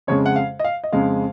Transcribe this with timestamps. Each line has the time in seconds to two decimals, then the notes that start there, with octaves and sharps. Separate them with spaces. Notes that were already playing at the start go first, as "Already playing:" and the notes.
0.07 F2 C#3 G#3 C#5
0.26 F#5
0.36 F5
0.59 D#5
0.64 F5
0.84 D#5
0.92 F2 C#3 G#3 F5